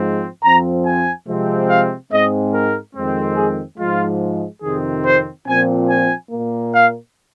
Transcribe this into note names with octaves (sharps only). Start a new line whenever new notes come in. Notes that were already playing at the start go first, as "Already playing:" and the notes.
Already playing: G#2 F3 G#3 C4
F2 F3 C4 A#5
G#5
C3 F3 G#3 C4
F5
G#2 G#3 C4 D#5
A#4
F2 D#3 G#3 C4
G#4
G#2 F3 G#3 F4
F2 C3 D#3 C4 G#4
C5
A#2 F3 C4 G#5
G#5
A#2 A#3
F5